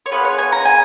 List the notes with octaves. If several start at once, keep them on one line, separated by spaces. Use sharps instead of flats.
C#5
B3 F4 G#4 B4
C#5
G#5
A#5
G#5